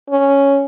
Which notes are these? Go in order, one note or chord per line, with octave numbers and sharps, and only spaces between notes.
C#4